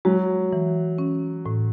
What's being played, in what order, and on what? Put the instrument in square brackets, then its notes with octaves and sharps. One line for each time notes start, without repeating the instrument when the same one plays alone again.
[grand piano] F#3 [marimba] G#3
[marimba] E3
C#4
A2